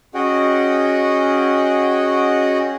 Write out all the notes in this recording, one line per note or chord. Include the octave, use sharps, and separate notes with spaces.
C#4 F#4 G#4 D#5 F#5 G5